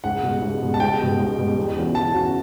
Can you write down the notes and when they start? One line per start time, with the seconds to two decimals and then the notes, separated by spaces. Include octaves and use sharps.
0.04 C#2 F#5
0.23 B2 G3
0.42 C#2
0.62 B2 G3
0.74 A5
0.80 C#2 G5
0.99 B2 G3
1.19 C#2
1.38 B2 G3
1.57 E2
1.76 C#3 E3 B3 F#4
1.95 E2 A5
2.14 C#3 E3 B3 F#4